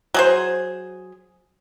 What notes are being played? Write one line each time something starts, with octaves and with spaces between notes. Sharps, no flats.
F#3 G#4 C5